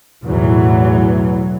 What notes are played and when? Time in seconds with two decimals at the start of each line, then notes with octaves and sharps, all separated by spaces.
0.25 B1 E2 A2 E3 F#3